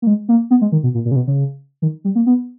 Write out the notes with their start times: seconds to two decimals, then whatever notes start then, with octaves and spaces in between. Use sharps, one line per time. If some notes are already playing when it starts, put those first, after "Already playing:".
0.02 A#3
0.07 G#3
0.29 A#3
0.51 B3
0.61 G#3
0.72 D#3
0.83 B2
0.94 A#2
1.05 A#2
1.11 C#3
1.16 B2
1.27 C#3
1.82 D#3
2.05 G3
2.15 A#3
2.27 B3